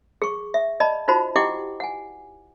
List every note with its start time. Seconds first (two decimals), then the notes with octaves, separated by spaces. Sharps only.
0.22 G#4 C#6
0.54 E5
0.80 D5 D#5 A5 B5
1.08 D#4 F4 F#4 C5 A5 B5
1.36 E4 G4 D#5 F#5 G5 D6
1.80 F#5 G#5